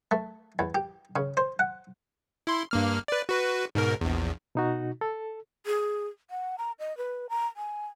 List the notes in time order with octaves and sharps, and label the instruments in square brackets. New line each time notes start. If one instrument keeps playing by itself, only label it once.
[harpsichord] A3
E2
G4
C#3
C5
F#5
[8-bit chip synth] E4 C6
G2 A#3 F6
B4 D5
F#4 B4
G#2 B2 A#4
A#1 E2
[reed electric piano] B2 D#4 F#4
A4
[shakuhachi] G#4
F#5
A#5
D#5
B4
A#5
G#5